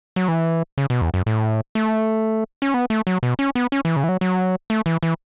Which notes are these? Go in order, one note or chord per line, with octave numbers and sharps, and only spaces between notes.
F#3
E3
C#3
B2
E2
F#2
A2
A3
C#4
B3
A3
F#3
B2
C#4
B3
C#4
E3
C#3
E3
F#3
F#3
A3
E3
E3